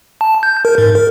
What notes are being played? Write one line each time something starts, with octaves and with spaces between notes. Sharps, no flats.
A5
G6
A#4
G#2
A#4